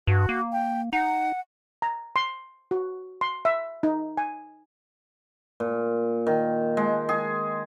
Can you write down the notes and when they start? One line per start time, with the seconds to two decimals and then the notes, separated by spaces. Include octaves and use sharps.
0.07 G2 F#4
0.29 A#3
0.52 G5
0.93 D#4 F#5
1.82 A#5
2.16 C6
2.71 F#4
3.21 C6
3.45 E5
3.83 D#4
4.17 G#5
5.60 A#2
6.27 D#3
6.77 G#3
7.09 G#4